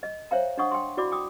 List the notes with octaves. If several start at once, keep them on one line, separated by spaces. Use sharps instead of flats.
D#5
C5 C#5 E5 F5 G5 A#5
D4 D#5 F#5 C#6 D#6
G5 C6
E4 F#4 D5 B5 D6
G5 D6 D#6